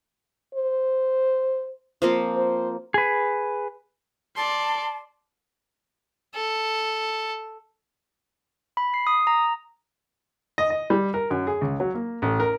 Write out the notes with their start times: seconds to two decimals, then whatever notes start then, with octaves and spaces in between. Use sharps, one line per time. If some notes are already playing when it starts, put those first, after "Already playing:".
0.55 C5
2.02 F3 A#3 C4
2.37 C5
2.94 G#4 B4
4.37 D5 A5 C6
6.35 A4
8.77 B5
8.94 C7
9.07 D#6
9.27 A#5
10.58 D#5
10.70 D#5
10.90 G3
11.14 A#4
11.31 F#2
11.47 G#4
11.61 C#2
11.80 F#3
11.94 A#3
12.22 A1
12.40 A#4